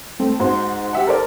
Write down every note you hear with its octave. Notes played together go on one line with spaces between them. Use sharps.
A3 C4
G#2 F#4 C5 C6
G4 E5 F#5
A4 A#4 C5 D5